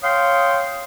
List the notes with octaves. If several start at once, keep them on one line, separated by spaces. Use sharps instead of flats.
C#5 F5 G5 C6 D#6